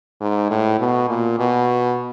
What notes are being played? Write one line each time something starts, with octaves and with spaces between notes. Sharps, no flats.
G#2
A2
B2
A#2
B2